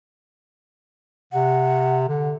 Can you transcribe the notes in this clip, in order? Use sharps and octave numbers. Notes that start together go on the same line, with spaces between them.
C3 F#5
D3